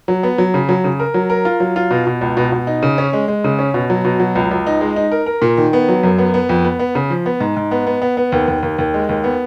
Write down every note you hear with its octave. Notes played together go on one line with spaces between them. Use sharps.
F#3
B3
F#3
C#3
F#3
C#3
A#4
F#3
A#4
F4
F#3
F4
B2
B2
C#2
B2
B2
D#4
C#3
C#4
G#3
G#3
C#3
C#4
B2
F#3
B2
F#3
C#2
C#2
D#4
G#3
D#4
A#4
A#4
A#2
D#3
B3
F#3
F#2
B3
B3
F2
B3
B3
C#3
F3
B3
G#2
G#2
B3
B3
B3
B3
D#2
D#2
D#2
D#2
G#3
D#2
B3